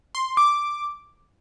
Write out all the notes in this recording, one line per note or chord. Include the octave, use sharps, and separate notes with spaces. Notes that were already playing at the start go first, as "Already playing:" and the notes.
C6
D6